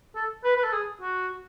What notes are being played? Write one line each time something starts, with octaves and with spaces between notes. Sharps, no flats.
A4
B4
B4
A4
G#4
F#4